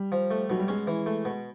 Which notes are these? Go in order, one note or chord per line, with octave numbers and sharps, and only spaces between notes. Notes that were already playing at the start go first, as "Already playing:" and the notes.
Already playing: G3
F3
A3
B2 F#3
G3
G#3 C#4
E3
A3
B2